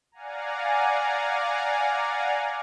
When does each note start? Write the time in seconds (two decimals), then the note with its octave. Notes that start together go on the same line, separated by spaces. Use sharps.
0.12 D5 F5 F#5 G#5 A#5